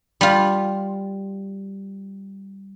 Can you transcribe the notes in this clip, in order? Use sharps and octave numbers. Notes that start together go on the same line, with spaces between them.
G3 F4